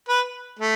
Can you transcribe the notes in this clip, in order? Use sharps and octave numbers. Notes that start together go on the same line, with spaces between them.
B4
A3